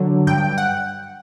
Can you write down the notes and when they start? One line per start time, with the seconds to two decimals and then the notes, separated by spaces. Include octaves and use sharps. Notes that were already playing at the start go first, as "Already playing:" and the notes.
Already playing: D3 F#3
0.27 G2 G5
0.58 F#5